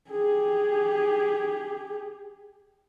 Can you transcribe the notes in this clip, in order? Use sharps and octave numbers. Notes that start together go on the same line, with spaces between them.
G4 G#4